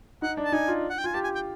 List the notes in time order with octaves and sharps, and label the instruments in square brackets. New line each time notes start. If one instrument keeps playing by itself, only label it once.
[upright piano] D#4 [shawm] F#5
[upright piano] D4
[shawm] A5
[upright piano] D#4 [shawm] G#5
[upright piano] F4
[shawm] F#5
G5
[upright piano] F4 [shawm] G#5
[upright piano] G4 [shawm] A5
[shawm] G#5
G5